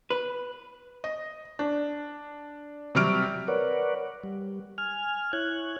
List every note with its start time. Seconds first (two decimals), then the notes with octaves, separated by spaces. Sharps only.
0.10 B4
1.04 D#5
1.59 D4
2.95 C3 F#3 G3 F6 D7
3.48 A#4 B4 C#5 D5 F#5
4.23 G3
4.78 G#5 F6
5.33 E4 C#5 F#6 G#6